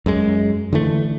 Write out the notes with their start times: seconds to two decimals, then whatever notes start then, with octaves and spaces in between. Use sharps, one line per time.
0.06 F#2 G#3
0.73 D3 E3 A3